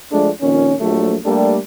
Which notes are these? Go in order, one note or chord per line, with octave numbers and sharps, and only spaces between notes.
F3 G#3 A3 D4
F2 A#2 D#3 C#4
A#1 F#3 A3
G3 A3 A#3 D4 G4 A4